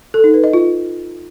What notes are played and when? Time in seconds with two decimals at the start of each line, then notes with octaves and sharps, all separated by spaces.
0.14 A4
0.24 D#4
0.34 B4
0.44 D#5
0.53 F4